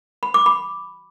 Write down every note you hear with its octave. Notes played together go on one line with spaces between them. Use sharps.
B5
D6
B5